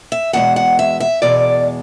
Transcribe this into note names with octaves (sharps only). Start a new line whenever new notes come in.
E5
E2 B2 G#3 F#5
F#5
E5
E5
E2 B2 G#3 D5